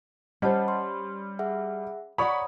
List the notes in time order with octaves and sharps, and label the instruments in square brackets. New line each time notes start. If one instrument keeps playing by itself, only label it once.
[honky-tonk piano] G3 [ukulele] C#4 C5 [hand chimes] D#5 F#5 A5
[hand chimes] C6
G#4 E5 F#5
[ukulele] C#5 D5 F#5 [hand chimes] A#5 D#6 [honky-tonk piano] B5 C#6